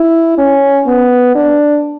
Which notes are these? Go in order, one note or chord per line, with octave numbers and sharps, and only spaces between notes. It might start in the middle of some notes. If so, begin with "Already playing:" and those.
Already playing: E4
C#4
B3
D4